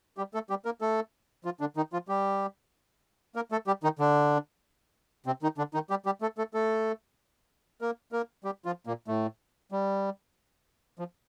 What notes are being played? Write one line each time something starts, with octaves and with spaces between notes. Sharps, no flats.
G3 G4
A3 A4
G3 G4
A#3 A#4
A3 A4
F3 F4
D3 D4
D#3 D#4
F3 F4
G3 G4
A#3 A#4
A3 A4
G3 G4
D#3 D#4
D3 D4
C3 C4
D#3 D#4
D3 D4
D#3 D#4
G3 G4
G3 G4
A3 A4
A3 A4
A3 A4
A#3 A#4
A#3 A#4
G3 G4
F3 F4
A#2 A#3
A2 A3
G3
F3